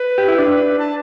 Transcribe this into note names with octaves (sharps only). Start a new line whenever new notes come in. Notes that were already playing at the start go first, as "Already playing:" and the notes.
Already playing: B4
G4
E4
D4
A5